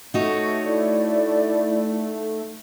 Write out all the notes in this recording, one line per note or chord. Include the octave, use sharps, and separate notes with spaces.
A3 D#4 F#4 C#5
E4 D5